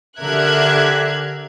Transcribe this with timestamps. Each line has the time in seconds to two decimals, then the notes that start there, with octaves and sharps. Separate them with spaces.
0.19 D3 G4 A#4 E5 F#6 G#6